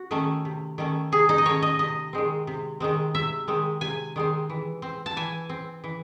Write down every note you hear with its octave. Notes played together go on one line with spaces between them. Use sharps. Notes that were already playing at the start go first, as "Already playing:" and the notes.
Already playing: F#4
D#3 A3 C#4
C3
D#3 A3 C#4
C3 G#4
D#4
D#5
D#3 A3 C#4 C#5
D#5
C3 D#5
D#3 G#3 C4
C3
D#3 G#3 C4
C3 E5
D#3 G#3 C4
C3 G#5
D#3 G#3 C4
E3
C4
A5
E3 G#5
C4
E3